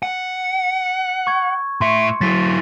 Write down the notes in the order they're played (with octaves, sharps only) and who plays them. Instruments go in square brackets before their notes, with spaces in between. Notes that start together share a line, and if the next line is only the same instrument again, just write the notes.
[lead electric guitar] F#5
[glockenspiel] C#6 G#6
[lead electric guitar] A2 E5 [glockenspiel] C6 C#7
[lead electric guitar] F#3 E4 [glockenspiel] A6 B6